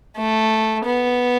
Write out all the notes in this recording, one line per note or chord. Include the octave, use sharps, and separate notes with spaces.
A3
B3